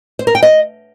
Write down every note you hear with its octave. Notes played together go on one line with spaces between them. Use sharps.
C5
A#4
G5
D#5